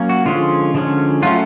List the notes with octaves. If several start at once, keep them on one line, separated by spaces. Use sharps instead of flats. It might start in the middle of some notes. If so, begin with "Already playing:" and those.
Already playing: F#3 A#3 C#4
F#4
D3 F3 G#3 C#4 F4
D3 F3 G#3 C#4
F#3 A3 C#4 F4